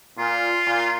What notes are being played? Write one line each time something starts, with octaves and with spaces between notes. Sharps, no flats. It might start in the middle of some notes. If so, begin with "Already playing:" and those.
A#2 F4
A#2